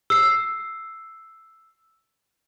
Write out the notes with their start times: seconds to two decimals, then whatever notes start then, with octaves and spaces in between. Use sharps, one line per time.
0.10 E6 C7